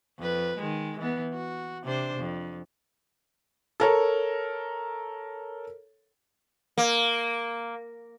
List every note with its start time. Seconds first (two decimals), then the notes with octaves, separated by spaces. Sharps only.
0.19 F2 B4
0.58 D#3 G#3
0.99 E3 B3
1.33 F#4
1.84 C3 D4 C5
2.18 F2
3.80 A4 A#4 C#5
6.78 A#3